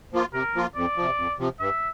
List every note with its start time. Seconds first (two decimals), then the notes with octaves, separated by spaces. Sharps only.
0.13 F3 A#3 F4
0.33 C3 A#4
0.55 F3 A#3 F4
0.75 F2 D5
0.96 C3 F3
1.18 F2
1.39 C3 F3
1.60 G2 E5